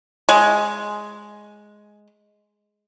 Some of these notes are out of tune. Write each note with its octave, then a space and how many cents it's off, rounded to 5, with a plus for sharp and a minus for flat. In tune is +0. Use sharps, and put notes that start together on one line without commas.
G#3 +5